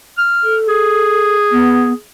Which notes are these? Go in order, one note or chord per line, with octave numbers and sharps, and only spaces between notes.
F6
A4
G#4
B3